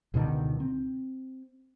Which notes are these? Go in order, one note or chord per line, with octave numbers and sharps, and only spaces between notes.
C#2 B2 D3 D#3
C4